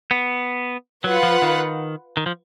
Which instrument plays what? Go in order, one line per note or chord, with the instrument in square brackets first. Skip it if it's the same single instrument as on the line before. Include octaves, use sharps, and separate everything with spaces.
[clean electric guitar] B3
[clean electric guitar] F#3 [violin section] F4 B4 F#5
[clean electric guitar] F3
D#3
D#3
F3